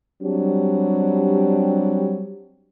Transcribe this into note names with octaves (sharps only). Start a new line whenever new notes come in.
F#3 G3 C4 D4 G4